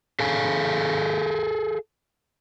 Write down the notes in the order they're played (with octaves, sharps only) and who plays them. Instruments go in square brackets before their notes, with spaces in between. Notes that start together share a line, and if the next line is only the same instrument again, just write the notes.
[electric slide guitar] G#4 A4 F5 G#5